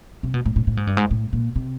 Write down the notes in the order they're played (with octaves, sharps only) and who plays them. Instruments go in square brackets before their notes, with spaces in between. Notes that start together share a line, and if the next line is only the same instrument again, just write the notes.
[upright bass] C3
B2
A2
A2
A2
G#2
G2
G#2
A2
A#2
C3